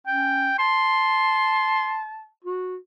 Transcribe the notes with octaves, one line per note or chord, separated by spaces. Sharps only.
C#4 G5
A5 C6
F#4